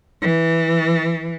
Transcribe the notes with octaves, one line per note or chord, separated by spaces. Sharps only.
E3